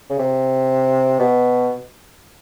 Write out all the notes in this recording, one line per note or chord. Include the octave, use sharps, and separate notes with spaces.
C#3
C3
B2